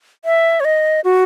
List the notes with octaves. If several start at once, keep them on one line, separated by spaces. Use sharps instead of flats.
E5
C#5
D#5
F#4